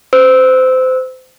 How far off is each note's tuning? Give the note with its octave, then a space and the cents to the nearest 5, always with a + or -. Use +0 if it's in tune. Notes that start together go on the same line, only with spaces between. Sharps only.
C5 -25 E6 -15